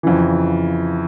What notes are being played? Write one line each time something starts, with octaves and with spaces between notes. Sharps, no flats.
F2 C#3 E3